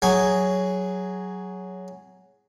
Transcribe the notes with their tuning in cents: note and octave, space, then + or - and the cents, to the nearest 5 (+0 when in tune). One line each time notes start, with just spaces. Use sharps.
F#3 +5 G#4 +0